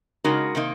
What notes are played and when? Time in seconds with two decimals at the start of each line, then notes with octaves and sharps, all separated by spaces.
0.24 C#3 G#3 D#4 F#4 A#4
0.55 C3 D#3 A#3 D#4